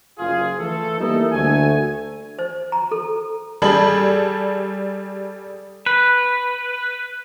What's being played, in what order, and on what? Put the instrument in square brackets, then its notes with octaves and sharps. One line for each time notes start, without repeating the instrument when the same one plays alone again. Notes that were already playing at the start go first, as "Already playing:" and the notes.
[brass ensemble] F#1 F4 G#4
E3 A3 A4
G3 A#3 D#4 E4 A4
D2 A3 G#5
[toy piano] C5
A#5
A4
[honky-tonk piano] G3 G#4 A4 B5 F#7
[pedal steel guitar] B4